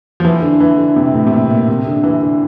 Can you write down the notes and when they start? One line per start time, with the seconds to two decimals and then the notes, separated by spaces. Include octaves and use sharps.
0.20 F3
0.25 E3
0.42 D3
0.60 E3
0.78 D3
0.96 C3
1.14 A2
1.27 C3
1.32 A#2
1.50 A#2
1.68 C3
1.87 D3
2.04 E3
2.22 D3